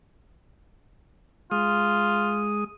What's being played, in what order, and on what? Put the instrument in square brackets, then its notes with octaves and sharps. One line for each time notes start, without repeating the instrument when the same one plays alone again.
[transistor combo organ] G#3 D#6 [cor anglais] F4